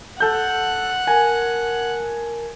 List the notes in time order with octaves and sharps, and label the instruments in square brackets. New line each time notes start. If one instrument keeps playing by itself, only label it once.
[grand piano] A4 G6 [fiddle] F#5
[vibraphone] A#4 A5 [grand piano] G#5